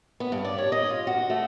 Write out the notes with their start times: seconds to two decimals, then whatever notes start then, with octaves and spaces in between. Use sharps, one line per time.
0.20 B3
0.32 G2
0.45 D5
0.58 C#5
0.72 D#5
0.90 F4
1.07 F#4
1.30 A3